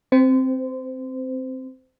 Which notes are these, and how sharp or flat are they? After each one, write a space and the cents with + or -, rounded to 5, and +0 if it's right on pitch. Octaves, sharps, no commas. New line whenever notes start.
C4 +0 C5 -25